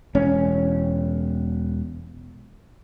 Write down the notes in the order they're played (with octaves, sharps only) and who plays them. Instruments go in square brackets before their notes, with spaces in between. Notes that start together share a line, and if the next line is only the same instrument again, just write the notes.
[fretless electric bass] E1 C#4